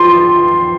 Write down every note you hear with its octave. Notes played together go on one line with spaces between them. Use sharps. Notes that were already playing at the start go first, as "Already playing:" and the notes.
Already playing: F3 C6